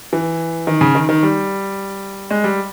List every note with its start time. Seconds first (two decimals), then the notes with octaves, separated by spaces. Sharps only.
0.13 E3
0.67 D#3
0.81 C#3
0.95 D#3
1.09 D#3
1.23 G3
2.31 G#3
2.44 G3